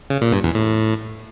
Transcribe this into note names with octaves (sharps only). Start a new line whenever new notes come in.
C#3
A#2
G2
E2
A2